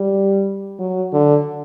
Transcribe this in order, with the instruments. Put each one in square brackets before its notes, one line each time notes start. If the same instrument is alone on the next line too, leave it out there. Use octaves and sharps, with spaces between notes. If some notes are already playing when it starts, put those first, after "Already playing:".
Already playing: [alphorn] G3
F#3
D3